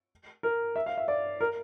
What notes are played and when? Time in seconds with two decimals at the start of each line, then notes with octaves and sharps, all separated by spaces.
0.43 A#4
0.76 E5
0.86 F5
0.97 E5
1.08 D5
1.41 A#4